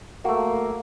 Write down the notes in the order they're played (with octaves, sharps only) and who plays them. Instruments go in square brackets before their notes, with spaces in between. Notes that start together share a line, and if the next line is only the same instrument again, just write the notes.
[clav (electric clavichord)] A3 F#4 [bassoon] A#3